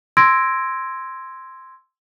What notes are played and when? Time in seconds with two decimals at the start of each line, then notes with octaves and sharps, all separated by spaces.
0.17 C6 E6 G#6 A#6 D7